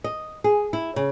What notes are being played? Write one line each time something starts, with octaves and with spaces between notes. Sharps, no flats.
D#5
G#4
E4
C#3